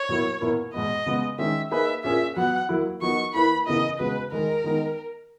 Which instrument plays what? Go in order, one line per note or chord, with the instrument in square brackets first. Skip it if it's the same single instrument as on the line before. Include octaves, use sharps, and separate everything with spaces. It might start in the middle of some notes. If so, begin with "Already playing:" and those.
Already playing: [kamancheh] C#5
[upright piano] B2 F#3 A#3 E4
B2 A#3 E4 A#4
[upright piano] B2 G#3 B3 [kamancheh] D#5
[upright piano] C#3 G#3 B3
[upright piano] D#3 G#3 C#4 [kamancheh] E5
[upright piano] A#3 D#4 G#4 B4 [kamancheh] E5
[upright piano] A#2 A#3 C#4 G#4 [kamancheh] E5
[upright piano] F#3 B3 F#4 [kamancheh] F#5
[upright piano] F#3 A#3 E4
[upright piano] F#3 B3 D#4 F#4 A#4 [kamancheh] C#6
[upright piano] E3 A#3 E4 B4 [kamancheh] B5
[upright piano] C#3 E3 B3 E4 A#4 [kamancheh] D#5
[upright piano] C#3 G#3 B3 F#4 [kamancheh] B4
[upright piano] D#3 G#3 D#4 G#4 [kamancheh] A#4
[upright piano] D#3 G#3 B3 D#4